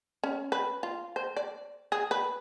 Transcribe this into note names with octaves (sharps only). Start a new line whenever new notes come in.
C#4
B4
F4
C5
D5
G#4
B4